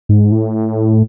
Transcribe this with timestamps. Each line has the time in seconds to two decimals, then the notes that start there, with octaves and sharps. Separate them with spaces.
0.09 G#2
0.32 A2